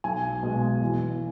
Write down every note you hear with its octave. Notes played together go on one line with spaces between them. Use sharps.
B1 G#5
B2 G#3
E2